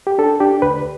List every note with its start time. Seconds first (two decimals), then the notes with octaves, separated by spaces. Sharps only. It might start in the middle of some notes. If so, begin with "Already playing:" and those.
0.07 G4
0.18 D4 A4
0.40 D4 G4
0.62 D2 B4